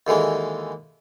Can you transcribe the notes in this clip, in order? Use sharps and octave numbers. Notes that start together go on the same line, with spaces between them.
D#2 D3 E3 G#3